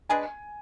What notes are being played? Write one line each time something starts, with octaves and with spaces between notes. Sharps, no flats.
G#3 D4 G#4 B4 G#5